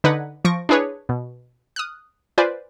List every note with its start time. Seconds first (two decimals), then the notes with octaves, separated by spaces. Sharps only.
0.04 D3 D#4 B4 D#5 F#5 G#6
0.45 F3 C#6 A#6 D7
0.69 D4 E4 G#4 B4 C#5
1.09 B2
1.76 D#6 F6 F#6
2.38 F4 B4 C5 D5 G#5